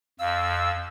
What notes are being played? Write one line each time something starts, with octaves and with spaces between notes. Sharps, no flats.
F2 F5 E6